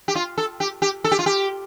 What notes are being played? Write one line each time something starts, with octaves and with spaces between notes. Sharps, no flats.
G4
F4
A4
G4
G4
A4
G4
F4
G4